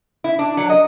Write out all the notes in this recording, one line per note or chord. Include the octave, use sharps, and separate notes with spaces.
E4
D4
F#3
D#5